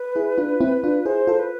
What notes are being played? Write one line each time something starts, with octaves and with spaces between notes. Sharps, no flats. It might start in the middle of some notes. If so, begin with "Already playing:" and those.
Already playing: B4
E4 G#4
D4 F4
C4 E4
D4 F4
E4 G#4 C5
F4 A4
B4